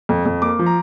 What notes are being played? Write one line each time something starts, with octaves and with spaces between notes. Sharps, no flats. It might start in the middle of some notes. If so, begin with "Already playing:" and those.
F2
F2
A#3 D6
F3
A#5